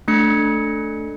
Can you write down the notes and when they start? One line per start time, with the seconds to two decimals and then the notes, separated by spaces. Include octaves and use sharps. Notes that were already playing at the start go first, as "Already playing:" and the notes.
0.08 A3 D4 C#7